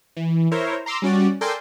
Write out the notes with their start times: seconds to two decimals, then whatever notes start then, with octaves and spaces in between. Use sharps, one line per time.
0.17 E3
0.51 E4 A#4 C5 C#5
0.86 A#5 C6 D6 E6
1.02 G3 C#4 F#4 D5
1.41 A4 A#4 D5 G5 G#5 C6